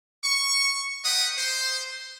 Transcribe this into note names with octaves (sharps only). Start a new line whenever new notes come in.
C#6
B4 D#5 F#5 G5 D#6
C5